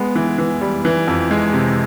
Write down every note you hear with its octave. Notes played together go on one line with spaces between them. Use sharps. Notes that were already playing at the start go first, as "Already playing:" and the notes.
Already playing: G#3 B3
E3
E3
G3
E3
F2
G#3
C3